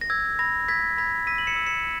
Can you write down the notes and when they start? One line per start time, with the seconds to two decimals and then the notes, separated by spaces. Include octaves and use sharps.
0.01 A#6
0.10 E6 G#6
0.39 B5 A#6
0.68 E6 G#6 B6
0.98 B5 G#6 B6
1.27 E6 B6 D#7
1.38 F#7
1.47 C#7 E7
1.56 E6
1.67 C#7 E7